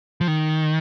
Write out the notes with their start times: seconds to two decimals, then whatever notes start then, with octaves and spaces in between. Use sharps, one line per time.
0.21 F3
0.28 D#3